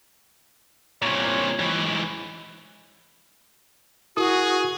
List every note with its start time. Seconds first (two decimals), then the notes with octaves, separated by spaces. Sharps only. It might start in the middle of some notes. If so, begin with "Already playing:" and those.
1.02 C2 A#2 C#5
1.59 G#2 E3
4.17 E4 F#4 G#4 A#4 D#6